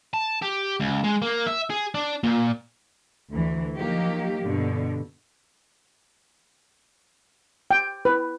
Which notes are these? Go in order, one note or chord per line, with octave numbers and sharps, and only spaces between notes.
A5
G4
C#2
G#3
A#3
E5
G#4
D4
A#2
D2 E3
F3 F#3 A#3 D#4 G4
G2 B2 D3
G5
B4